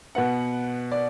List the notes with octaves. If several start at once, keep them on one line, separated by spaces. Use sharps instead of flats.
B2 B3 F#5
D5